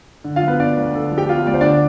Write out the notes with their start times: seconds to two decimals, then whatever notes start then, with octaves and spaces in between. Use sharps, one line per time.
0.24 D3
0.36 F4 F5
0.43 F3 B3 B4
0.60 B3 D4 D5
0.77 D2
0.95 D3 A4
1.12 F3
1.18 G4 G5
1.29 B3 F4 F5
1.47 D2 D5
1.54 C5
1.61 D3 D4 D5